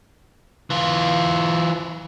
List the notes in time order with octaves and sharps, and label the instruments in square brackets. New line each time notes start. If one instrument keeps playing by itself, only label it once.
[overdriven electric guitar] E3 F4